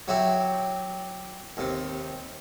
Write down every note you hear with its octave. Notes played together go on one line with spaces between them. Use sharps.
F#3 E4 F#4 G4
D#2 C3